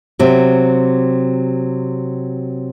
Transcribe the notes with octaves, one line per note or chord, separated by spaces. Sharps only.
C3 F#3